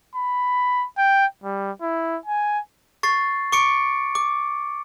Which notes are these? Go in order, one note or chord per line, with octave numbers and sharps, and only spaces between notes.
B5
G5
G3
E4
G#5
C#6 A6 C7
C#6 D6 C#7 D7
D6